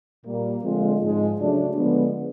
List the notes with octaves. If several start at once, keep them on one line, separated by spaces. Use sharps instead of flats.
A#2 G3 A#3
D3 F3 G#3 C4 F4
G#2 F3 G#3
C#3 F#3 A3 D4
D3 F3 G#3 B3